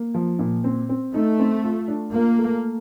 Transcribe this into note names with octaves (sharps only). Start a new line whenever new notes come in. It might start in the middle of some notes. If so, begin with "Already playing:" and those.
Already playing: A#3
F3
A#2
C4
C4
A3 D#4
C4
F4
D4
A#3 F4
A3